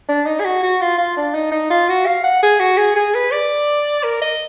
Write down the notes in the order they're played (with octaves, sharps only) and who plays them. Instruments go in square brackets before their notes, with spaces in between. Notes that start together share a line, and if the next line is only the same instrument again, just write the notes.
[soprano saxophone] D4
D#4
G#4
F#4
F#4
F4
F4
D4
D#4
D#4
F4
F#4
F5
F#5
G#4
F#4
G#4
G#4
B4
D5
A#4
D#5